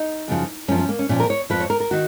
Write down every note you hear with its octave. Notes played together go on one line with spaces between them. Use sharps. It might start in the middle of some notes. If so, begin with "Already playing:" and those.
Already playing: D#4
F#2 C#3 F3
F#2 F3 C#4
C#4
A#3
C#4
A#2 F3 C#4
A#4
C#5
F2 F3 B4
C#5
A#4
A#4
D#3 F#4